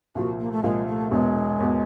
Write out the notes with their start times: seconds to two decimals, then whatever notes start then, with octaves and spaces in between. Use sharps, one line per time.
0.15 C2 A#2 F3 F#4
0.40 A#3
0.52 A3
0.63 C2 A#2 F3 G#3
0.87 A3
1.11 E1 E2 B2 G#3
1.58 E1 E2 B2